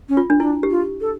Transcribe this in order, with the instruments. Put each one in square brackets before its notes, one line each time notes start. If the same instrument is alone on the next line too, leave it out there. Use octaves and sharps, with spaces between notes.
[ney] C#4
[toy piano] F4
D4
[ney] D4 [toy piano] E4
[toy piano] G4
[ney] F4
A4